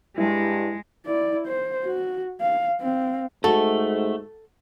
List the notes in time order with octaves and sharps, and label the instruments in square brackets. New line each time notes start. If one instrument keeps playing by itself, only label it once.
[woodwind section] G2 [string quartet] G#3 [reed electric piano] E4
[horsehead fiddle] E4 D5
C5
F#4
F5
C4 F5
[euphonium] G#2 [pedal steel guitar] A3 [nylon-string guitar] F#4 [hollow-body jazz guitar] A4